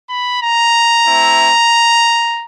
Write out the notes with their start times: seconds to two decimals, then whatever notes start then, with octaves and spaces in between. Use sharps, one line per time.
0.10 B5
0.41 A#5
1.07 A3 C4 E4